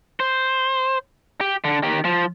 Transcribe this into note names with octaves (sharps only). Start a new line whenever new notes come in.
C5
G4
D3
D#3 G4
F3